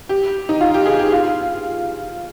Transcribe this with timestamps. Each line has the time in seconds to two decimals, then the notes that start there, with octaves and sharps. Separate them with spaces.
0.09 G4
0.49 D#4
0.61 F4
0.74 G4
0.86 G#4
0.99 G4
1.12 F4